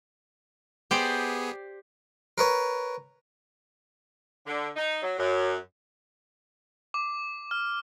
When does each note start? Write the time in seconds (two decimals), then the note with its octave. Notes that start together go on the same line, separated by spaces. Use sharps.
0.91 B3 G4 G#4 C5 D5
2.38 A#4 B4 C#5
4.47 D3
4.76 D#4
5.02 F#3
5.19 F#2
6.94 D6
7.51 F6